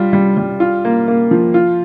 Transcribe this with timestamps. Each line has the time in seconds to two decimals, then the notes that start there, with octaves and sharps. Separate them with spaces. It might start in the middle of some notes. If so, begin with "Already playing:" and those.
Already playing: G3 F4
0.13 G3
0.37 G3
0.60 F4
0.85 A#3
1.08 A#3
1.31 F3
1.54 F4